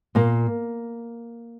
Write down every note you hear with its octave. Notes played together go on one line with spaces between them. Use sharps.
A#2 A#3